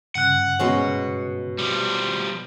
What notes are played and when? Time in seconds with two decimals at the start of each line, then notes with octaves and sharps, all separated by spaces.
0.15 G2 C#3 F#5 F#6
0.60 B2 G#3 C#4
1.58 F3 G3